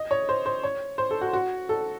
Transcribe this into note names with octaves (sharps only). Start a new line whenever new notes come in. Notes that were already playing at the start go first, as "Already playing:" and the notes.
Already playing: D#5
C#5
C5
C5
C#5
C5
A4
F#4
F#4
A4